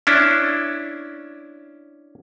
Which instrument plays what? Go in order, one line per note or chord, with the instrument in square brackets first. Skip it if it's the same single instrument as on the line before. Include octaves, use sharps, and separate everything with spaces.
[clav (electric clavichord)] C#4 D4 E4